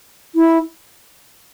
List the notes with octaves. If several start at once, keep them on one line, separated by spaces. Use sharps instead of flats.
E4